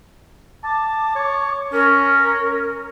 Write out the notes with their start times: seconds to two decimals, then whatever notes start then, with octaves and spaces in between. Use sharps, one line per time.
0.64 A5 D6
1.15 C#5
1.73 C#4 A#4